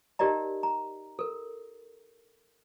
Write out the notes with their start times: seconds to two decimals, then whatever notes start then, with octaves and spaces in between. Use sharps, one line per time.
0.19 D#4 G4 A#4 D5 D#5 A#5
0.63 A#5
1.19 A4 A#4